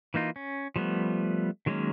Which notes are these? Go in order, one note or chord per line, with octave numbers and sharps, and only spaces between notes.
E3 A#3 D#4 F4
C#4
F3 G3 A3 B3
D#3 F#3 G#3 A#3 C#4